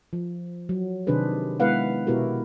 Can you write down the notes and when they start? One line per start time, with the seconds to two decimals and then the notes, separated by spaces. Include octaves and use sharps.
0.13 F3
0.69 F#3
1.07 C3 D#3 D4 G#4 B4 C5
1.60 G#3 B3 E4 B4 F5 F#5
2.07 B2 B3 E4 F#4 G4 A#4